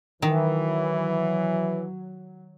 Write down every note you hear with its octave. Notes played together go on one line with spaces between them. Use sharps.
D#3 E3 F#3